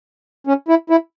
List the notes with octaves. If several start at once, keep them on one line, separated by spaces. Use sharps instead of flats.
C#4
E4
E4